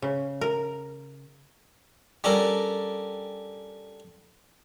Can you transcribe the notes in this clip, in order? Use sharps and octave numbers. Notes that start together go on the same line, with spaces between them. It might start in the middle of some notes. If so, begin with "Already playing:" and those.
C#3
A#4
G3 C#4 D4 A4 A#4